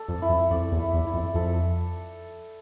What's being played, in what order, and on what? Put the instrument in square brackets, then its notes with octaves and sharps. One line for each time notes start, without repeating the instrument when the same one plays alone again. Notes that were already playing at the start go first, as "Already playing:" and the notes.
Already playing: [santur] A4 D5
[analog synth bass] F2
[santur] E4
[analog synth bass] F2
[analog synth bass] F2 [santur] D5
[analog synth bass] E2
[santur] E4
[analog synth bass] E2
[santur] E4
[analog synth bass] F2
[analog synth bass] F2 [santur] A4